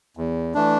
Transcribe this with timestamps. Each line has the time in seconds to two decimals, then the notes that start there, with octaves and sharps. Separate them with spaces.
0.17 E2
0.54 E3 A3 D4